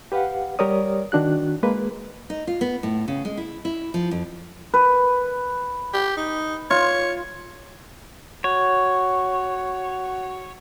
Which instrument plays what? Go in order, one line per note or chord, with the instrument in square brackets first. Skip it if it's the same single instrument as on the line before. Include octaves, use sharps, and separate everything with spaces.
[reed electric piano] G4 B4 F5 F#5
G3 G4 A#4 C#5 D5 D#6
D#3 D4 F#4 F#6
G#3 A#3 B4
[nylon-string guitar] D#4
F4
B3
A2
C#3
G#3
E4
E4
F3
F2
[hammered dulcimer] B4
[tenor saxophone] G4
D#4
[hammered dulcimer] F4 [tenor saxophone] C#5
[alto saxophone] F#4 [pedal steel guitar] C#5